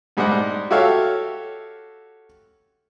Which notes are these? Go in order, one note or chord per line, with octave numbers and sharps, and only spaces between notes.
G#2 G3 G#3 D4 F#5
F#4 G4 A4 C#5 E5 F5